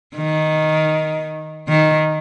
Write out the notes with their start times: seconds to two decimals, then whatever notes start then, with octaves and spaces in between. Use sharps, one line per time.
0.15 D#3
1.69 D#3